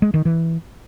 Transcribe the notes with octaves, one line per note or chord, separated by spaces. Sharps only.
G#3
D#3
E3